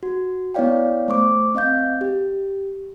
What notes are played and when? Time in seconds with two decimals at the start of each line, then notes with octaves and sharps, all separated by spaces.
0.03 F#4
0.54 B3 E4 C#5 D5 F5 G5
1.08 A3 C5 C#6 D6
1.55 C4 D#5 F5 G6
2.01 G4